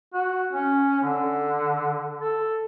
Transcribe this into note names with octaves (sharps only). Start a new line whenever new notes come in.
F#4
C#4
D3
A4